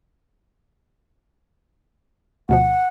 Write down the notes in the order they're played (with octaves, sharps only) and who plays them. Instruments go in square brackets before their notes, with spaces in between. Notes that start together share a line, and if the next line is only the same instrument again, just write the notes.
[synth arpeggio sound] D2 B2 F3 [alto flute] F#5